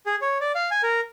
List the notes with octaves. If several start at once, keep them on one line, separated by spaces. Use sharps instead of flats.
G#4
C#5
D5
F5
G#5
A#4